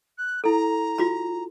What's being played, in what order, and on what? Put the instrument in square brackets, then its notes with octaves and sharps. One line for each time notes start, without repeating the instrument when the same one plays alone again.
[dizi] F#6
[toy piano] E4 A4 [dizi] A#5
[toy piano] F4 F#4 B5